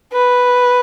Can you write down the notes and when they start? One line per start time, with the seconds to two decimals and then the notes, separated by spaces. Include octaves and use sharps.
0.13 B4